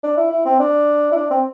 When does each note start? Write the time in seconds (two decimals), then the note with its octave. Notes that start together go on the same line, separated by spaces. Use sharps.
0.03 D4
0.17 E4
0.32 E4
0.46 C4
0.59 D4
1.12 E4
1.16 D4
1.31 C4